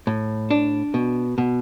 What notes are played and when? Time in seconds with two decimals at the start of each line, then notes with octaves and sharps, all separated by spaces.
0.07 A2
0.51 D4
0.94 B2
1.38 B2